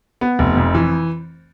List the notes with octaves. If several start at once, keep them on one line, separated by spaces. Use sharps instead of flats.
B3
F1
F2
E3